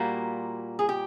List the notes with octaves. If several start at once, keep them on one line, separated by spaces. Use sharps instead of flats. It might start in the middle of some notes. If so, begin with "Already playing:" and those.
Already playing: A#2 G3 A#3 F#4
G#4
G4